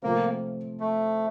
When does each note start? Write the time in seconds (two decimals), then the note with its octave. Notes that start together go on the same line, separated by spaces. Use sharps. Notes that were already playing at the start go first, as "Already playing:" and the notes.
0.02 C3 F3 A3 A#3 C4
0.80 A3